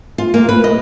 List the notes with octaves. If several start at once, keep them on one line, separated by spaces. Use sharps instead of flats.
F4
A#3
B4
D#5